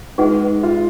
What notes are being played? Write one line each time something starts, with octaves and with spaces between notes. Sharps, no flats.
G#3 D#4 G#4 B4 F#5
F4